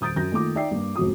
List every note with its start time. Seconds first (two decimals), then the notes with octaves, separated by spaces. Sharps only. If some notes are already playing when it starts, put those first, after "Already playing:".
0.01 D#1 D#6 G6 A6 D7
0.16 F#2 G6 A#6
0.31 D#3 A3 A#3 F4 D6
0.55 D#4 D5 E5 G5 C7
0.71 G2 A#3
0.96 F1 G#2 B2 F#4 D#6